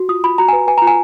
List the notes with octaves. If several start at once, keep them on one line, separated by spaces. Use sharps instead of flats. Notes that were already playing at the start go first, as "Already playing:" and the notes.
Already playing: F#4
F4 D#6
F4 B5
F#4 A#5
B4 G#5
B4 G#5
F4 A#5
G#5